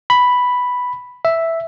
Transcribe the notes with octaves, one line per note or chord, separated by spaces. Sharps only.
B5
E5